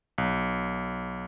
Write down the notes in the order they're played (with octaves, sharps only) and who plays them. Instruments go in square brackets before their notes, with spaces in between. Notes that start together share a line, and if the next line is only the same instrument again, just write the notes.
[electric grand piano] B1